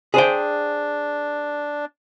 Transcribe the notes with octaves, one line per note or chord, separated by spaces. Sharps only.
D4 G#4 C5 G5